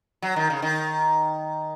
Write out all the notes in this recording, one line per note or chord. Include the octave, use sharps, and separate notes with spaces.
F#3
D#3
C#3
D#3